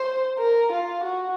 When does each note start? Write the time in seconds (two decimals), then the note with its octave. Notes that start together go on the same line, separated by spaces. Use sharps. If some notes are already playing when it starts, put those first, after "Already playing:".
Already playing: C5
0.39 A#4
0.72 F4
1.04 F#4